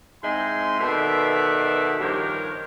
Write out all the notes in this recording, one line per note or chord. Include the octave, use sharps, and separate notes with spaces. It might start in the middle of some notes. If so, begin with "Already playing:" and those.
G#2 C4 E4 D#5 G#5 C6
B2 D#3 B3 A4 D5 E5
G2 D#3 F3 G4 A#4 C#5